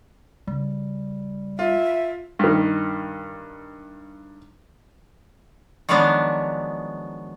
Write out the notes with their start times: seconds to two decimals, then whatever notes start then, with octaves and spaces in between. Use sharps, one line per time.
0.47 C#3 G3
1.59 F4 E5
2.39 G2 D#3
5.89 D#3 F3 F#3 G#3 B3 D4